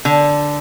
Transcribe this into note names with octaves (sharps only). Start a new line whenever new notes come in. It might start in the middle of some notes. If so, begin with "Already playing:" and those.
D3